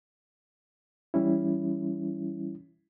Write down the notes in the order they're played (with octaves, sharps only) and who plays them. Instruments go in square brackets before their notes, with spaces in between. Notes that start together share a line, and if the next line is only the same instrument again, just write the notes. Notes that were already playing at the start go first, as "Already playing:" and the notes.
[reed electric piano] E3 G3 C#4 E4